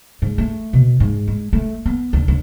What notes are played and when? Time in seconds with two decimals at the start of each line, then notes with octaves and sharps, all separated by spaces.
0.22 G#2
0.38 A3
0.73 B2
1.00 G#2
1.28 G#3
1.53 A3
1.86 B3
2.13 D2
2.28 D2